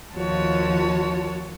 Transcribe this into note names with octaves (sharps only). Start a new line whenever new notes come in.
D#2 F3 F4 F#4 C#5 A5